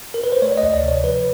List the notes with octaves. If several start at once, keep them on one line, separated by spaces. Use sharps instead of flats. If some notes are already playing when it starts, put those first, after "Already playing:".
A#4
B4
C5
A3 C#5
D5
D#5
D2
D5
C3
C#5
F3 B4